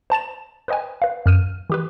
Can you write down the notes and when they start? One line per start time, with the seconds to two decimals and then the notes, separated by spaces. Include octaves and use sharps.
0.10 C5 A5 A6 E7
0.68 B4 C5 D#5 G5 G#5
1.02 B4 F5
1.26 F#2 F6 D#7
1.70 E3 G4 B4